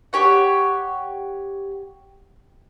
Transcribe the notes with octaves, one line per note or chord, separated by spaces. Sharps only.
G4 C#5 F#5